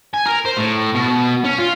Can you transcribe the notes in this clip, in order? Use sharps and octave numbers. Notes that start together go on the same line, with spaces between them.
G#5
A#4
C5
A2
B2
C#4
F4